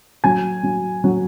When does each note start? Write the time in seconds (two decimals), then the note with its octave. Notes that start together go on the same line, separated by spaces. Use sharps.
0.24 F#3 G#5
0.63 F#3
1.04 F#3